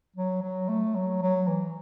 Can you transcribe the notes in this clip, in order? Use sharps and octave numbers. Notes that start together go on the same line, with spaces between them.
F#3
F#3
A3
F#3
F#3
E3